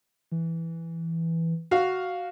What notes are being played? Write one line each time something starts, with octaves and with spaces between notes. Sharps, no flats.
E3
F#4 F5